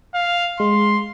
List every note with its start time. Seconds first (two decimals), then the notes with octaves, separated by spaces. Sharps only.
0.14 F5
0.60 G#3 C6